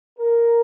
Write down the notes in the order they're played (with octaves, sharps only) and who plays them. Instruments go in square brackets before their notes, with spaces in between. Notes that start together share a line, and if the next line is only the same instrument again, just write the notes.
[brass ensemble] A#4